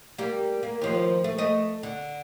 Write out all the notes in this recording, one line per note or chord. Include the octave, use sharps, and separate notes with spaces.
G3 A#3
A#3
D#2 F3
A3
A3 D#5
D3